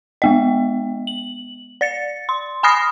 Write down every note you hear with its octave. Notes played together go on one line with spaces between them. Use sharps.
G#3 B3 D#5
F#7
D5 A6 C#7
C6
G#5 B5 D#6 F6 A#6 C7